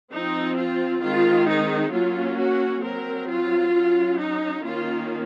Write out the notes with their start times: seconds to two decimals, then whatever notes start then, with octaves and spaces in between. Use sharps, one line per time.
0.12 F3 C4 D#4
0.56 F4
1.01 D#3 G#3 C4 F4
1.47 D#4
1.92 F#3 A#3 C#4 F4
2.38 F#4
2.82 F#3 C4 A#4
3.27 F4
3.73 F#3 C#4
4.18 D#4
4.63 D#3 A#3 C#4 F4